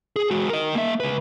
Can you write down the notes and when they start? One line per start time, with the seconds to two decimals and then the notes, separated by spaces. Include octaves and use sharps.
0.16 G#4
0.31 G#3 F#4
0.49 A#4 D#5
0.75 A#3 E5
1.00 C#2 B4